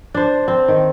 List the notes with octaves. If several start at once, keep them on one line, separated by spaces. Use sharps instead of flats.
D4 C5
C4
D#3